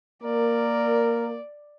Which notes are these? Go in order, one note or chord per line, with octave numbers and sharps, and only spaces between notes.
A#3 A#4 D5